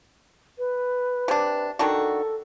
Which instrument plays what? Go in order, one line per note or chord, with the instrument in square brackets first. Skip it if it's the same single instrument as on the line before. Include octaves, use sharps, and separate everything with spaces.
[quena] B4
[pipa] C3 D4
[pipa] D#3 D4 F#4 [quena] A4